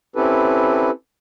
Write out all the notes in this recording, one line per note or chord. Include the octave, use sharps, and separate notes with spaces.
C4 C#4 E4 G4 A4 B4